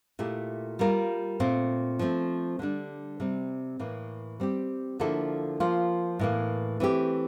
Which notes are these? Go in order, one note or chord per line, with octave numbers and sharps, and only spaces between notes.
A#2 A3 E4 G4
G3 A#3 F4 A#4
A#2 A3 C4
F3 A3 C4
D3 G3 D4
C3 G3 C4
A2 E3 A#3
G3 C4 G4
D3 F3 A#3 E4 A4
F3 A#3 F4
A2 E3 A#3
E3 A3 C4 G4